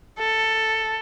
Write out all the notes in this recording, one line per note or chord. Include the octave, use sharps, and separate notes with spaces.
A4